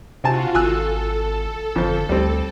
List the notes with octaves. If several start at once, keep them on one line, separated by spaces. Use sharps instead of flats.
C3 C4 F4 F#4 G#5 A5
G#1 A4 G#5 E6 F#6
G1 F2 C5
D2 G3 C4